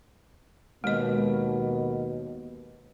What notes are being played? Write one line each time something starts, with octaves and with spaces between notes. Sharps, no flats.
D#2 B2 G#3 D#5